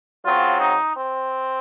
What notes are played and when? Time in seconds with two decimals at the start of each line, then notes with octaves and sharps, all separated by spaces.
0.25 C#3 F#3 C4 F4
0.60 D#4
0.96 C4